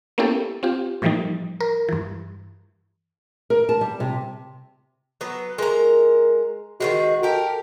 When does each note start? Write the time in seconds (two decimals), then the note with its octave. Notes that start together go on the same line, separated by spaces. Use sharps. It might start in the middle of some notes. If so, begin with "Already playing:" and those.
0.18 A#3 B3 C#4 E4 G4 A4
0.63 C4 F4 G4
1.02 A2 E3 F3 G3 A#3 D#4
1.60 A#4
1.89 G2 E3
3.50 A#4
3.69 A5
3.81 G3
4.00 C3
5.21 F#3 B3
5.58 G#3 A#4 A#5
6.80 D#3 E3 G#3 F#4
7.23 G4 A4 A#4